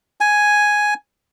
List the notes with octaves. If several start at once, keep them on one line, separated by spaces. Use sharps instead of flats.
G#5